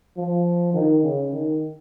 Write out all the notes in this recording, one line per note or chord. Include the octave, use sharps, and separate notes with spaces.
F3
D#3
C#3
D#3